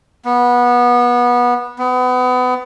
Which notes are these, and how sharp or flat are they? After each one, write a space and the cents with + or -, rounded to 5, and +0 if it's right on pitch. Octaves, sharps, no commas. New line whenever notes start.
B3 -20
B3 +30